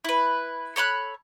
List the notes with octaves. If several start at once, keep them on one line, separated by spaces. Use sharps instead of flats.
E4 B4
A4 C#5 B5 F#6